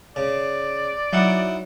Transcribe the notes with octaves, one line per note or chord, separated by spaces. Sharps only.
C#3 D5
F#3 D#4 E4 F#5